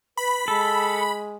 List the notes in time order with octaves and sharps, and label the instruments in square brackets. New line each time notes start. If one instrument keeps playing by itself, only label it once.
[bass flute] B4 [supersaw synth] B5
[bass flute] G#3 [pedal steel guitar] A4